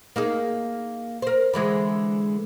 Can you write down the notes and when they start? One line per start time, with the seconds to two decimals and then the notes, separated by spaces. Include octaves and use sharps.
0.16 A#3 D#4 G#4
1.22 A#4 C5
1.54 D3 E3 G#3